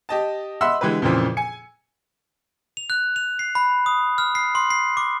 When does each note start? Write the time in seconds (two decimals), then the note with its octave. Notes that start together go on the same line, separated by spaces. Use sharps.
0.09 G4 D#5 A5
0.61 D#5 E5 F#5 B5 C6 E6
0.81 D3 E3 G#3 G4 B4
1.02 F2 A#2 C#3 E3 F3
1.37 G#5 C#7
2.77 F7
2.90 F#6
3.16 F7
3.39 C7
3.55 B5
3.86 D#6
4.18 F6
4.35 C7
4.55 C6
4.70 C7
4.97 D6